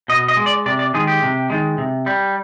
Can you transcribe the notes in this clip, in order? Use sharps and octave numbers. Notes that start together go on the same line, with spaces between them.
B2 D#5
D#5
G#3
D5
C3 D5
D5
D#3 G#3 G#4
G4
C3
D#3 G#3
C3
G3